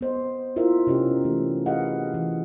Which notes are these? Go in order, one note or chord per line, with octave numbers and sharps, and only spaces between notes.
B3 C5 D#5
E4 F4 A#4 C5 E5
C3 C#4 D#4 G4
E3 A3
G4 G#4 B4 D#5 F5 F#5
E3